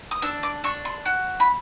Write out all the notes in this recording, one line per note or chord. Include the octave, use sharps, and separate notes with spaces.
D#6
D4 E6
D6
D4 C#6
C6
F#4
B5